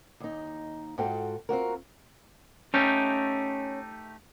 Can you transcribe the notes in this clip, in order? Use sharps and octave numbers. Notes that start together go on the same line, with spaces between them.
D#2 D#4
G#2 F4 F#4 A4 G5
C4 F4 F#4 A#4
A3 C#4 D#4 G4